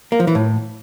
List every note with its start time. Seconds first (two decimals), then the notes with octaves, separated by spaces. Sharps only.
0.12 A#3
0.20 F3
0.27 E3
0.35 A2